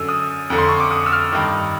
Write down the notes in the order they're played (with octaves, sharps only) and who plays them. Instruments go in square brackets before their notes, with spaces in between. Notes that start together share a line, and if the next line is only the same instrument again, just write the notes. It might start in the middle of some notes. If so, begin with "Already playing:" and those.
Already playing: [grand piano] F#2 D3 E6
D#6
F2 D3
C6
C#6
D6
D#6
E6
F6
G2 D#3